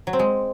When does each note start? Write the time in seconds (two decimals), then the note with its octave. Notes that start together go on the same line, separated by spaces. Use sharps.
0.07 F#3
0.13 C4
0.19 G#3